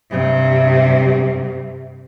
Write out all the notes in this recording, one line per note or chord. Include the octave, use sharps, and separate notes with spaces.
G2 C3